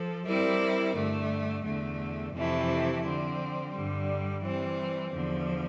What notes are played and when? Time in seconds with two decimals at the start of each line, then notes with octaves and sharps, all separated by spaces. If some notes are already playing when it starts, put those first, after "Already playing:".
Already playing: F3 A4
0.26 G3 C4 E4 A#4 D5
0.95 G2 D3 A3
1.65 E2 D3 A3
2.34 F2 C3 E3 A3 E4
3.04 D3 F3 C4
3.73 G2 D3 G3
4.43 E3 G3 C4
5.12 E2 D3 F3